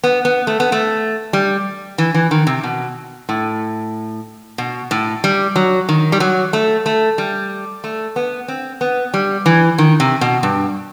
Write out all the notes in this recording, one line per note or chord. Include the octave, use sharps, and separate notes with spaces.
B3
B3
A3
B3
A3
G3
E3
E3
D#3
C3
B2
A2
B2
A2
G3
F#3
D#3
G3
F#3
A3
A3
G3
A3
B3
C4
B3
G3
E3
D#3
C3
B2
G2